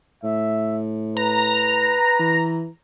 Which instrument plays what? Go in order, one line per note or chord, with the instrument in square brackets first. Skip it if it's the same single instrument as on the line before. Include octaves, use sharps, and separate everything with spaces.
[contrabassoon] A2 [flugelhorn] E5
[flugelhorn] B4 [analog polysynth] A#5
[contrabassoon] E3